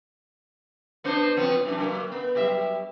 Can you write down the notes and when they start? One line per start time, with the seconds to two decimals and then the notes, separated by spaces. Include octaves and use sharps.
1.04 B3 D4 C5
1.37 F3 B3 C4
1.65 E3 F#3 D4
1.78 F#3 A#3
2.12 B3
2.35 F#3 G3 E5